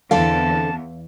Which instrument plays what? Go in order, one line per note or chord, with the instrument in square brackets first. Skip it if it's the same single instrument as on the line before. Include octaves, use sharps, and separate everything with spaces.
[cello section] E2 [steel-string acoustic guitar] D3 C4 A4 [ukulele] F5 [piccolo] A5